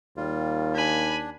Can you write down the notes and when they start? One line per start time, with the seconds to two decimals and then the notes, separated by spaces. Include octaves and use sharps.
0.17 D#2 G3 F4
0.76 D4 G#5 B5